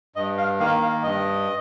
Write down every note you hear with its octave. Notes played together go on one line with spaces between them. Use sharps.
G2 D#5
F5
D#3 A#3 F5
F5
G2 D#5